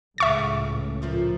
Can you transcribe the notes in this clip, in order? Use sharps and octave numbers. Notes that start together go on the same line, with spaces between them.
C#2 A2 E5 C#6 A6
A#2 F3 A3